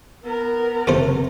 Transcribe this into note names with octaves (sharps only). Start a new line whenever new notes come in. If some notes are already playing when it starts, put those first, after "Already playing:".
B3 A#4
F#1 C3 A3 F4 C5